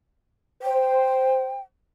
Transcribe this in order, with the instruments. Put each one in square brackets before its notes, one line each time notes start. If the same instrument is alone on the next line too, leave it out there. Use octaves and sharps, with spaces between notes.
[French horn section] C5 [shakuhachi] G5